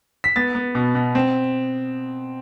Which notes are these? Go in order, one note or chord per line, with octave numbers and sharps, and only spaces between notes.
B6
B3 A6
B3
B2
B2
C4